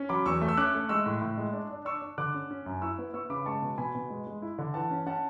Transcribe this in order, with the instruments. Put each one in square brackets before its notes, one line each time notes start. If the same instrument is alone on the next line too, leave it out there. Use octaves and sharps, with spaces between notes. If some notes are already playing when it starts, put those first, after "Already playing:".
Already playing: [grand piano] C#4
F#3 B5 D6
E2 C#6 E6
A3
E6
C#4 D6 F#6
A3
G#3 C#6 E6
A2
A2
G#3
D4
D4
D4 C#6 E6
D4
D3 D6 F#6
C#4
C#4
F#2
E4 C#6 E6
B3
B3 C#6 E6
C#3 B5 D6
G#3 A5 C#6
B2
B2 G#5 B5
B2
G#3
G#3
E4
D3
E3 F#5 A5
C#4
C#4 F#5 A5